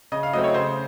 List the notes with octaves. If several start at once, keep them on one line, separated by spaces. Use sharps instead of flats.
C#3 D#5
F5
F#3 A3 C4 D#5
C#5
C#3 C5